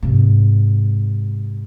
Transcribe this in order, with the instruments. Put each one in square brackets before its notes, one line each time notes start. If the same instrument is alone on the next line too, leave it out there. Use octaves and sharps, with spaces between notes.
[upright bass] G#2 C3